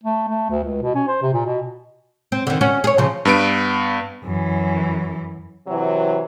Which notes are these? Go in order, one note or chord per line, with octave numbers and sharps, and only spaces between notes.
A3
A3
D2
C#2
B2
C#4
C5
C3
A#2
B2
C4
D3 D#3
C#4 F#4
G#4 C#5
C#3 F3
G2 B3 D7
F#2 E3
C3 E3 F#3